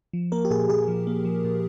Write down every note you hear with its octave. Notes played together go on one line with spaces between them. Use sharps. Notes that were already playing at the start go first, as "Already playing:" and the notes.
F3
A#3 A#4
G4
A#2 G#4
A#2 G#4
F3
A#3
F3
A#2